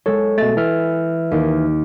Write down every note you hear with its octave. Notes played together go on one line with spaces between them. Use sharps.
G#3 A4 C#5
B2 G#3 A3 A6
E3 E5 F6
D#2